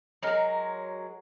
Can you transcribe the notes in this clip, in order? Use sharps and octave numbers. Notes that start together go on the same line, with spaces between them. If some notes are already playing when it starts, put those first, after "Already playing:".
F#3 G#3 A#4